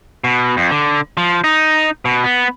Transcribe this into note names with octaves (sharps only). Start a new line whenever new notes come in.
B2
F2
D3
F3
D#4
B2
B3